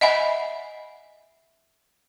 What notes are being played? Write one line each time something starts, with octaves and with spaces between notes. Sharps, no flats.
D#5 E5 F#5 G#5 B5